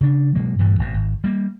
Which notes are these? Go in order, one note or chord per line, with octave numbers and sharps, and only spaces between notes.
C#3 D4
B2 F#3 G#3 A#3
G2 A#2 E3 G3
G#1 B2
G#1
G3 A#3